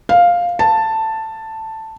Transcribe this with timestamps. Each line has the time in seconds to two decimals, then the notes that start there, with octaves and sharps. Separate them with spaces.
0.09 F5
0.59 A5